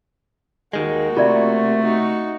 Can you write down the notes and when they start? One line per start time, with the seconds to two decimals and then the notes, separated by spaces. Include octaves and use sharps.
0.73 D#2 D#3 G#3 A#3 F#4
1.17 C3 A3 F4 D5 E5
1.81 D#4 F#4